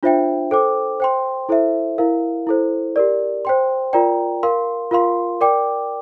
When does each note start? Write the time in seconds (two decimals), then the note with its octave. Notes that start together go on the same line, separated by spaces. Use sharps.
0.03 D4 F4 C5 E5 G5
0.51 A4 C5 G5 D6
1.00 C5 G5 C6
1.49 E4 A4 C5 E5
1.98 E4 A#4 F5
2.47 E4 A4 C5
2.96 G4 A#4 D5
3.45 C5 G5 C6
3.93 F4 A#4 D5 G5 A#5
4.43 A#4 F5 C6
4.91 F4 A#4 F5 C6
5.41 A#4 D5 G5 D6